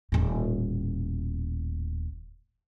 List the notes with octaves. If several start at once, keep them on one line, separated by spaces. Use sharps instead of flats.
D#1 A2